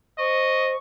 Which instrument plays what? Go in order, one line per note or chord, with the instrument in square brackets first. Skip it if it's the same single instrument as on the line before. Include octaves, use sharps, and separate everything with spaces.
[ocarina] C5 [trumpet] D#5 [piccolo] C#6